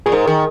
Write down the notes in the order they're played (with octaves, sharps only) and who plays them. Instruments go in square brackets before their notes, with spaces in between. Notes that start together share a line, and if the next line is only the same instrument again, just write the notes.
[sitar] A#2 [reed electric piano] G#4
[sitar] G#2 [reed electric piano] A#4
[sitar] D#3